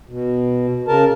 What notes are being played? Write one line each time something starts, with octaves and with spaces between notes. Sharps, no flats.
B2
C#3 A#4 A5